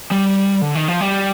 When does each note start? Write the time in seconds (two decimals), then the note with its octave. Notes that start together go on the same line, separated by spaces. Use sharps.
0.11 G3
0.62 D3
0.75 D#3
0.88 F3
1.01 G3